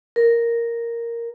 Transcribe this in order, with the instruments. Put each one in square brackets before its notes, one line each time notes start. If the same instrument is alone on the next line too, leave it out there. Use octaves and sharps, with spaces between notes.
[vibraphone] A#4